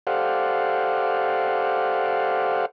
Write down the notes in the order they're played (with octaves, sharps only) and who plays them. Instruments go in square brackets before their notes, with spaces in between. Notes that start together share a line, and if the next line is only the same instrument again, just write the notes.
[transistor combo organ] G4 A4 C5 D5 F5 F#5